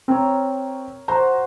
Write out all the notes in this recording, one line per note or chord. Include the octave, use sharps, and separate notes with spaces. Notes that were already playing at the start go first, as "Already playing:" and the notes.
C4 A#4 C#5
F#4 C5 A#5